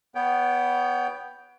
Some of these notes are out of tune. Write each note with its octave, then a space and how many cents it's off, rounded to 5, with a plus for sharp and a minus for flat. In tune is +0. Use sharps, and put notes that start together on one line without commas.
B3 +0 C#5 +35 G5 +0